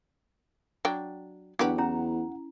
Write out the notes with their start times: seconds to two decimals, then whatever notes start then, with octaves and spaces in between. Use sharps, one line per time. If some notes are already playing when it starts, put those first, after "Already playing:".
0.85 F#3 D4 G5
1.59 E2 F#3 D4 G4 B4 F#5
1.78 C#4 E4 F#5 A#5